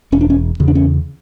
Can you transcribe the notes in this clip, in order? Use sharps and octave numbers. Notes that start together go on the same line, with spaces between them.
E1 C#4
D4
C#4
E2 C#3
D4
C#4